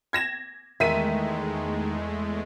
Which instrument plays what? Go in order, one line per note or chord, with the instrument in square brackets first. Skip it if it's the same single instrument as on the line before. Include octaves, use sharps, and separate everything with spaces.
[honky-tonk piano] G#6 A#6 E7
[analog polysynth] E2 G#3 A3 [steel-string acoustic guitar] D#3 [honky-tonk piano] E5 B6 D#7